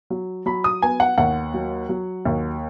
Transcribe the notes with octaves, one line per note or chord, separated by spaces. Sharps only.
F#3
F#3 B5
D#6
B3 G#5
F#5
D#2 F#5
F#3
F#3
D#2